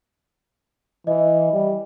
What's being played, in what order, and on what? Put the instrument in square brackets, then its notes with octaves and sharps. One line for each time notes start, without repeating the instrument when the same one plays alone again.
[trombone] E3 [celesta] D#5
[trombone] G3